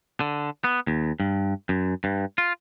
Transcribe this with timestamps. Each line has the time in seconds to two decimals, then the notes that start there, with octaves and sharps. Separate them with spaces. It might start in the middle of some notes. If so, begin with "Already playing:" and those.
0.20 D3
0.64 B3
0.87 D#2
1.20 G2
1.69 F#2
2.04 G2
2.38 F4